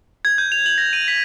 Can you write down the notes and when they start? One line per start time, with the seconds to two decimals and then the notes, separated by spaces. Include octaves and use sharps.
0.25 G#6
0.38 G6
0.52 F7
0.66 F#7
0.78 A#6
0.93 D#7
1.08 B6